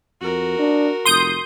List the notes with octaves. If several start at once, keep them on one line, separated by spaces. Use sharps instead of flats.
F2 F#4 A#4
D4
F1 C6 D#6 G6